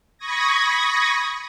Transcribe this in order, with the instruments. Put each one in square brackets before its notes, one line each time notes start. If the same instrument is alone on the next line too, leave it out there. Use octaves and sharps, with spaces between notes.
[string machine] B5 C#6 D#6 G#6 A#6